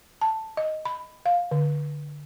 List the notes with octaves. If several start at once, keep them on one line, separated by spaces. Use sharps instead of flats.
A5
D#5
B5
F5
D3